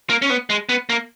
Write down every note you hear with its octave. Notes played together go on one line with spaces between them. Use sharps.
A#3
C#4
B3
G#3
B3
A#3